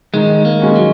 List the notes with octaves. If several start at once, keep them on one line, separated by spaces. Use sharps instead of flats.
D#3 G#3
A#3
G#3 C#4 F#4
F#3